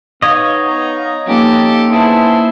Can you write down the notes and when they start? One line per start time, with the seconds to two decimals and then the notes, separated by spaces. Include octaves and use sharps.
0.22 B3 D#4 C#5 D#5 F5
0.68 A#5
1.27 F3 A#3 B3 C#4 D#4 F4 G4 A4
1.91 B3 E4 G#4 C5 A5